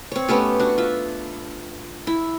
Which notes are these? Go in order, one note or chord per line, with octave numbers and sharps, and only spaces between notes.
C4 C#5
A3 B3 C#4 G4
D4 F#4
F4 E5
E4